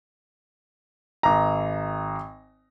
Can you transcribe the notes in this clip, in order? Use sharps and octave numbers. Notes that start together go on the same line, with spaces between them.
G#1 A#5